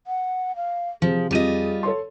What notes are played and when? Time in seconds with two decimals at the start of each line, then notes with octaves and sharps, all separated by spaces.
0.07 F#5
0.56 F5
1.02 C3 F3 G#4
1.31 F2 G3 F4 G#4 D#5 D#7
1.83 A4 C#5 C6